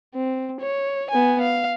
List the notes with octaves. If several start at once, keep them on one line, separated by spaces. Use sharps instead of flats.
C4
C#5
B3 G#5
F5